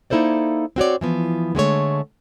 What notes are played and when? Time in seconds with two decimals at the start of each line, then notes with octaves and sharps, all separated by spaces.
0.10 A#3 D#4 E4 A4 C5 D5
0.76 C4 F#4 C#5 D5
1.01 E3 F3 B3
1.55 D3 G#3 A3 C#5